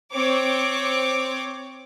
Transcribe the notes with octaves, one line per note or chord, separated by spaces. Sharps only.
C4 C#5 D6